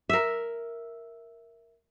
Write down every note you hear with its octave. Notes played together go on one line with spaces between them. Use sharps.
A#4 E5